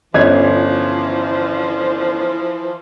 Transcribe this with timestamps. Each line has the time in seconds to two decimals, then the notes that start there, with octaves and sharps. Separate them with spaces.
0.14 G1 E3 F3 C#4 G#6